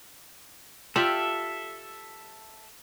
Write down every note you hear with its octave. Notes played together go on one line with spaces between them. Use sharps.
F4 G4 A4 D5 E5